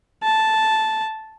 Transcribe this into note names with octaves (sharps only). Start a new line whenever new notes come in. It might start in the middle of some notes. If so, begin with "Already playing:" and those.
A5